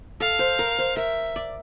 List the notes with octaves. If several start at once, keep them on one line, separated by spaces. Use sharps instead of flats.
A4 F5
C5
A#4
C5
A#4 E5
D5